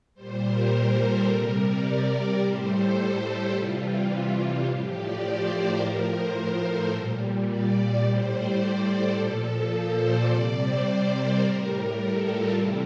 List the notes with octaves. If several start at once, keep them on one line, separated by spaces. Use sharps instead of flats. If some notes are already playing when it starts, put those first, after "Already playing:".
A#2 G3 C5
A#4
A4
C3 G3 A#4
D5
A2 G3 C5
A4
A4
G4
C3 E3 G3 F4
A2 F3 G4
D5
C5
A#4
A2 F3
C5
C5
A4
A#2 G3
D5
A2 G3 C5
D5
C5
A4
A#2 F3
A4
C5
D5
C3 G3
C5
A#4
A2 G3
A4
F4
C3 E3 G3 E4